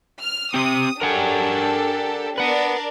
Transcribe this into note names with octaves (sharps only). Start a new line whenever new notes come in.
F6
C4 G4 D#6
D4 G4 A4 A#4 F#5 G#5
D4 A#4 B4 D5 F#5